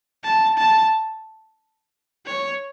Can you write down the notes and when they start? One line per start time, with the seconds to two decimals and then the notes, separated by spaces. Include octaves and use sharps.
0.24 A5
0.58 A5
2.26 C#5